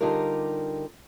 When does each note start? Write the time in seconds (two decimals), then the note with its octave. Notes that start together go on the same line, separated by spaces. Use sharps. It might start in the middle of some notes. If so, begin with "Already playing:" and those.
0.01 D3 G3 D#4 F4 G4 A#4